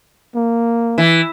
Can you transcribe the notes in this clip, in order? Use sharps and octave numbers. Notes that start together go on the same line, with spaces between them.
A#3
E3